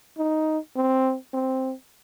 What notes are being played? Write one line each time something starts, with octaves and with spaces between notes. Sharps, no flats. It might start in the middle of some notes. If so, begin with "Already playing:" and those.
D#4
C4
C4